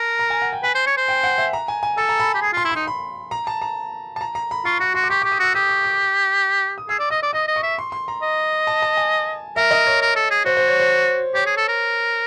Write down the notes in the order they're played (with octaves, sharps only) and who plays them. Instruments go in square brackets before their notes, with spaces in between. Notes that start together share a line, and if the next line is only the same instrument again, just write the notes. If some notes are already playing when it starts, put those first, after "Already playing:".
Already playing: [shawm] A#4 [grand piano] A5
[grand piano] A#5
G#5
F#5
G5
[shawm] B4 [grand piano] G#5
[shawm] C5
C#5
C5
[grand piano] G5
F#5
E5
A#5
G#5
G#5
[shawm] A4 [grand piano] A5
[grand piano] A#5
B5
[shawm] G4
G#4
[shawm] F4 [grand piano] C6
[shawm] E4
[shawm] D#4 [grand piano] C6
[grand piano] B5
A#5
A5
A#5
A5
A#5
A#5
B5
[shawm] F4 [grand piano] C#6
[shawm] F#4 [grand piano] C#6
[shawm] F#4 [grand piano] C6
[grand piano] D6
[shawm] G4 [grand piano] C#6
[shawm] G4 [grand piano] D6
[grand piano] D#6
[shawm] F#4 [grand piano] E6
[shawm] G4 [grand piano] D#6
[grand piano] C#6
D6
D#6
[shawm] G#4 [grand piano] E6
[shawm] D5
[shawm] D#5 [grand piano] D#6
[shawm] D5
[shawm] D#5 [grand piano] D#6
[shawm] D#5
[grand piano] C#6
[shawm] E5
[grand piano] C6
C6
A#5
[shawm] D#5
[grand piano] A5
A5
G#5
[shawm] A#4 [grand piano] E5
[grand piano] D#5
C#5
[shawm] A#4
A4
G#4
[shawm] F#4 [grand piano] C5
[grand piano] C5
C#5
C5
[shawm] G4 [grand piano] C#5
[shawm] G#4
A4
A#4